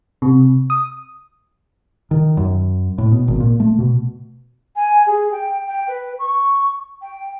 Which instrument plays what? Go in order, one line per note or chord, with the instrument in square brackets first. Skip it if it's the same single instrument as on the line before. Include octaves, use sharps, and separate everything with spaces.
[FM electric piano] C3
D#6
[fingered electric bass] D#3
F#2
A2
B2
G#1
A#2
A3
B2
[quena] G#5
G#4
G5
G5
B4
C#6
G5